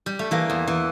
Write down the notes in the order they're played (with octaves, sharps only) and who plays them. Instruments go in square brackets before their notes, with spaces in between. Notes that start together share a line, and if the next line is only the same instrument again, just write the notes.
[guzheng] G3
A3
E3 A#3
E2
E3